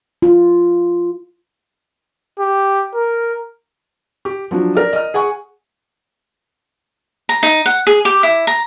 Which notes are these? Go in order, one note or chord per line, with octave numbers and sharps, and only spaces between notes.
F4
G4
A#4
G4
F3 F#3 D4
A#4 D5
D#5 F6
G#4 F#5 G#5 C#6
A#5
D#4
F#5
G#4
G4
E4
A#5